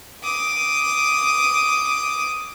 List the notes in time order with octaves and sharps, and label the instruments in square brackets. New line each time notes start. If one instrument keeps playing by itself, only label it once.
[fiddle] D6 D#6